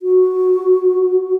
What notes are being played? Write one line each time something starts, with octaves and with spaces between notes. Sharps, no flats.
F#4